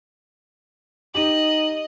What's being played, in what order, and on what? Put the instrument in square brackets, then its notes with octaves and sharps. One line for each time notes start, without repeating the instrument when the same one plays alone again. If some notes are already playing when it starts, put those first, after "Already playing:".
[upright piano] D#4 G4 [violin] D#5 [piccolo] F#7